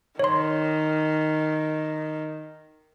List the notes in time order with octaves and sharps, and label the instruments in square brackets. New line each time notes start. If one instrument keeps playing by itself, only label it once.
[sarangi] D#3 [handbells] C#5 C6